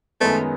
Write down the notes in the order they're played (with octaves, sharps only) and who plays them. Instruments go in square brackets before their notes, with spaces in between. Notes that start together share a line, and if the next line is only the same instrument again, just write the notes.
[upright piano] F#2 D#3 G#3 B3 [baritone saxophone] A3